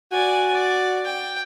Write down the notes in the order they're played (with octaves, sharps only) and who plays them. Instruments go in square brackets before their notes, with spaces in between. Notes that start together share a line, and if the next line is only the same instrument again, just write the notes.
[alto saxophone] F#4 [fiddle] D5 G#5
[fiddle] D5
G5